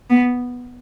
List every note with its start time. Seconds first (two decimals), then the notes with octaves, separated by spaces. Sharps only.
0.10 B3